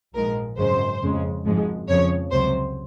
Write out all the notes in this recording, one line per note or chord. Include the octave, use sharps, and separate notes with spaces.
A#1 G#2 F3 G#3 A#4
G#1 F#2 C#3 G#3 C5
F2 C#3 G#3
G#1 G#2 F3 G#3
F2 C#3 F3 C#5
C#2 C3 F#3 C5